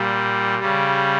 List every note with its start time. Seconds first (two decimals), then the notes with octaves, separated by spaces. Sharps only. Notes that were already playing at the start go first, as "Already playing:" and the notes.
Already playing: A#2 G3
0.59 C#3 G3